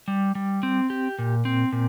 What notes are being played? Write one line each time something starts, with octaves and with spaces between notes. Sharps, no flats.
G3
G3
C4
G4
A#2
C4
A#2